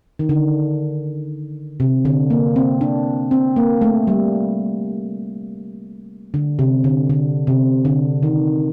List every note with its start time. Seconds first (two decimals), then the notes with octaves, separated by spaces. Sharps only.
0.19 D#3
0.29 D3
1.80 C3
2.05 D3
2.30 A#3
2.56 C4
2.81 D4
3.31 C4
3.56 A#3
3.81 A3
4.07 G3
6.34 D3
6.59 C3
6.84 D3
7.10 D3
7.47 C3
7.85 D3
8.23 D#3